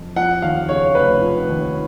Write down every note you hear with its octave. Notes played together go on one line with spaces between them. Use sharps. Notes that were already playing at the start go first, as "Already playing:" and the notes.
Already playing: F2
F3 F#5
D#2 F5
C#3 C#5
F1 B4
F3
D#2